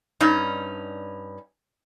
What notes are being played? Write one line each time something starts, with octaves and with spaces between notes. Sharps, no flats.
G2 C#4 D#4